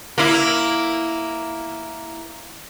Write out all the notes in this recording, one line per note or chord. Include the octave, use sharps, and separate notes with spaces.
A#3 E4